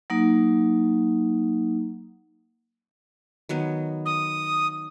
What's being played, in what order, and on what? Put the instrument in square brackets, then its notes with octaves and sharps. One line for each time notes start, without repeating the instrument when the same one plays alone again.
[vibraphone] F#3 A#3 D#4
[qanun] D#3 F#3 B3
[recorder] D#6